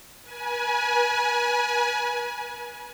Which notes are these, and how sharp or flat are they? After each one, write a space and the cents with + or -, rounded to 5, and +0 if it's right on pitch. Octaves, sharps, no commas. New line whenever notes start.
B4 -35 G#5 +20